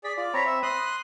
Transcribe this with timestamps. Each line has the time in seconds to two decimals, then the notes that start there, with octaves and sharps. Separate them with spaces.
0.04 G#4 D5 B6
0.17 F4 D5
0.34 C4 C#5 A#5 B5 A#6 B6
0.46 E5
0.63 C6 D#6 F#6